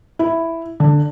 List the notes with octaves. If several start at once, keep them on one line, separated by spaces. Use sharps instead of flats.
E4
D3